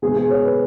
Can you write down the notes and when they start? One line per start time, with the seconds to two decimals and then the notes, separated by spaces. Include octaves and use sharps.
0.02 B2 G#3 B3 G#4
0.16 G#4
0.30 C#5
0.44 B4